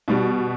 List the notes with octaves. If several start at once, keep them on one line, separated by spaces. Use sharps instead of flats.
B2 G3